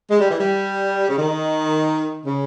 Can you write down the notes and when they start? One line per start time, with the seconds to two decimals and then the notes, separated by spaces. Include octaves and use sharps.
0.10 G#3
0.20 G3
0.30 E3
0.40 G3
1.08 C#3
1.18 D#3
2.25 C#3